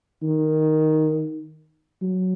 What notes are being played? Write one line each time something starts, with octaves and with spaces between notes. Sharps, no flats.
D#3
F#3